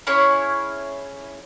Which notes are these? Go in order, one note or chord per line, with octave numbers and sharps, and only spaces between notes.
C#4 E4 G#4 C#5